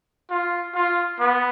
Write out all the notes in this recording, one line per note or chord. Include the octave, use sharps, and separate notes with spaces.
F4
F4
B3